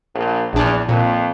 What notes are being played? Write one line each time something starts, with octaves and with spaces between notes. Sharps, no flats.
A#1
A#1 E2 D4
F2 A#2